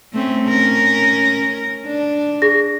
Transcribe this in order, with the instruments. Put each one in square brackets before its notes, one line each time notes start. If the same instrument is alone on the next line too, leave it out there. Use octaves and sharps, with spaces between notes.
[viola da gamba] A3 C4 C#4
C#4 A#4
D4
[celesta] G#4 A#6